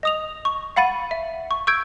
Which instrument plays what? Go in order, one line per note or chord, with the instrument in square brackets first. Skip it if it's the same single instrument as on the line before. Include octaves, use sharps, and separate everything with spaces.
[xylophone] D#5 D#6 F7
C#6
F5 F#5 B5 A6 D#7
E5
C#6
C#6 E6 G6 G#6 D7